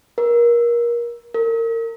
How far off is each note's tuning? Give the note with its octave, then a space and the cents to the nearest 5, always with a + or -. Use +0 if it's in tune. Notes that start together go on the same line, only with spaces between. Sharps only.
A#4 +25
A#4 -30